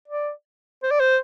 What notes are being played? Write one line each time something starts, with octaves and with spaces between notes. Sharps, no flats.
D5
C5
D5
C5